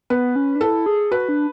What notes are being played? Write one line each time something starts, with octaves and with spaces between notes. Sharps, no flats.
B3 B4
C#4
D4
E4 A4
G#4
F#4 B4
D4